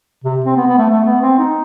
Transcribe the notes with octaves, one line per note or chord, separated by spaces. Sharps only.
C3
C4
B3
B3
A3
A3
B3
C4
D#4